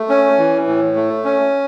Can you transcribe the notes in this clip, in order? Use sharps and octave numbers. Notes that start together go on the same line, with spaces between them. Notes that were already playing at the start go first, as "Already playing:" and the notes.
Already playing: A3
C#4
E3
A2
A3
C#4